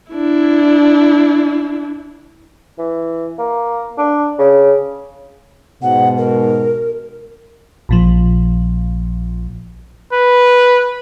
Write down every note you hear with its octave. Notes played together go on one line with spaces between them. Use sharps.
D4 E4
E3
A#3
D4
C#3
G#2 B2 F#5
A#4
A#1 A#2 F3
B4